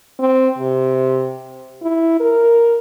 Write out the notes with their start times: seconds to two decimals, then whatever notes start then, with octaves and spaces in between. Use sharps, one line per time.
0.19 C4
0.58 C3
1.82 E4
2.20 A#4